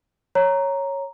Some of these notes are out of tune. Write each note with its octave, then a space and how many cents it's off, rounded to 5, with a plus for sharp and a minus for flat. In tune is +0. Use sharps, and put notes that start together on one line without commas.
C#5 -5 A#5 +0